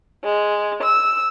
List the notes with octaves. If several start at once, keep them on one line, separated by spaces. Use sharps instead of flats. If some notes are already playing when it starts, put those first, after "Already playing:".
G#3
E6